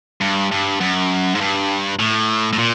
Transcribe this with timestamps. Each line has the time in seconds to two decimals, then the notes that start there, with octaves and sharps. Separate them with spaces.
0.21 G2
0.51 G2
0.80 F#2
1.35 G#2
1.41 G2
1.99 A2
2.53 A2
2.58 A#2